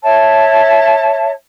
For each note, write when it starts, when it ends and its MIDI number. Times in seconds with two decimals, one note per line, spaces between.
0.02 1.29 73
0.02 1.29 76
0.02 1.29 81